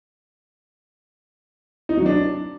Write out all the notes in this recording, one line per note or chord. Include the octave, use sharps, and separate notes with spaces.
D#4
F#3
D4